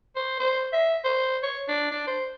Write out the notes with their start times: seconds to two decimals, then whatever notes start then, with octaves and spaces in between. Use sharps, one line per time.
0.16 C5
0.40 C5
0.73 E5
1.04 C5
1.43 C#5
1.68 D4
1.91 D4
2.07 C5